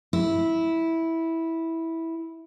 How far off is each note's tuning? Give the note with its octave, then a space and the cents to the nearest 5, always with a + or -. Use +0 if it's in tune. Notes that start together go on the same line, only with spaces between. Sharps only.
E4 -10